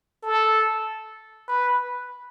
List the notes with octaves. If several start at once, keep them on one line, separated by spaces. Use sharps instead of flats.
A4
B4